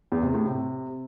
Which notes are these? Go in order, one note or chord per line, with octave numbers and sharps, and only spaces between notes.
E2
C3
A2
C3